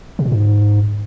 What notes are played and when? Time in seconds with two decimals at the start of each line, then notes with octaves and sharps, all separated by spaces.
0.19 C3
0.25 A#2
0.32 G#2